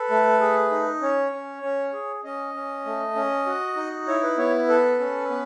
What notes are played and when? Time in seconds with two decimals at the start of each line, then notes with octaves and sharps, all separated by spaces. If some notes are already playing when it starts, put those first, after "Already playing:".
Already playing: A4 B4
0.10 A3
0.41 G#4
0.71 D#4
1.02 C#4 C#5
1.32 C#4
1.63 C#4
1.93 G#4
2.24 C#4 D#5
2.54 C#4
2.85 A3
3.15 C#4
3.46 F#4
3.77 D#4
4.08 E4 C#5
4.23 B4
4.38 B3 C#5
4.68 A4 B4
4.99 C#4
5.29 B3